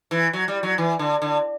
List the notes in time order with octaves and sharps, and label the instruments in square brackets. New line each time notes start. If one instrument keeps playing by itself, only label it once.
[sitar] E3
F#3
G3
F#3
E3
D3
D3